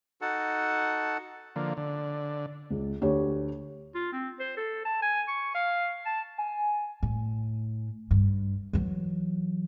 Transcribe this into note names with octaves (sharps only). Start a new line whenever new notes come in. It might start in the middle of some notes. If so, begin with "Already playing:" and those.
D#4 F#4 A4 F#5 A5
D3 F3 A#3
D3
C#2
D2 G4 C#5
F4
C4
C5
A4
A5
G#5
C#6
F5
A5
G#5
A2
G2
E3 F#3